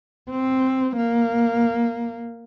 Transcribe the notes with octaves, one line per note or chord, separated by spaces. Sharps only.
C4
A#3